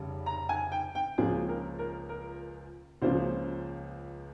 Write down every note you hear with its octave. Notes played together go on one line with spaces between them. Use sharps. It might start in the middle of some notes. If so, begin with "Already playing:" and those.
Already playing: F1 C#3 G3
A#5
G#5
G5
G5
C#2 C#3 F3 A#3 G#4
A#4
A#4
A#4
C#2 C#3 F3 A#3 C5